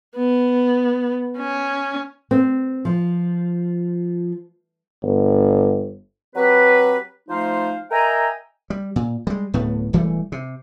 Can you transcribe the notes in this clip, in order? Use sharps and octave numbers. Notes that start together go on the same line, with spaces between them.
B3
C#4
C4
F3
G1
F#3 C4 G4 B4
F3 A3 D#4 C5 F5
A#4 D#5 E5 G5 G#5 A#5
G3
A#2
G3 G#3
D1 A2 A3 B3
E1 E3 G3 A3
C3